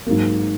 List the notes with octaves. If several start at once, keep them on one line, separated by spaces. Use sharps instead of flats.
G#2 F#3 A#3